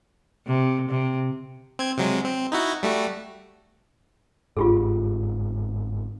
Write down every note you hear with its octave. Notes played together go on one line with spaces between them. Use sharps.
C3
C3
C4 G#6
C3 F#3 G#3
C4
D#4 E4 F#4
G3 A3 F#4
G1 G#2 F4 G4 G#4